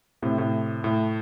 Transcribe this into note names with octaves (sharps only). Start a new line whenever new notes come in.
A2 C3
A2
A2